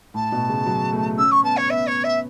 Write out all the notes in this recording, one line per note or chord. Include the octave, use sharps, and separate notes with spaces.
A2 A5
B2
C#3
F#3
A3
C#4 E6
C#6
B3 A5
C#5
B3 E5
C#5
E5